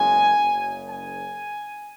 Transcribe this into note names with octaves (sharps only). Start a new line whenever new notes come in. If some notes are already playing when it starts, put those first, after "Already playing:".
Already playing: F#1 E2 C#3 G#3 C#4 G#5
F#1 F#2 C#3
G#5